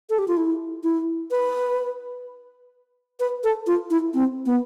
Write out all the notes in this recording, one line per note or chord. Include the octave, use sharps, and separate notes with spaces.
A4
G4
F4
E4
E4
B4
B4
A4
F4
E4
C4
B3